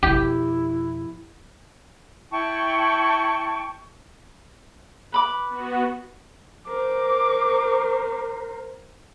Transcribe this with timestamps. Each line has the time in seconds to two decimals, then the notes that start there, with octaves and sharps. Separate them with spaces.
0.03 F2 B2 E4 G4
2.31 E4 G5 A5 C#6
5.12 B4 B5 D6
5.49 B3 F#4
6.68 A#4 C5 D6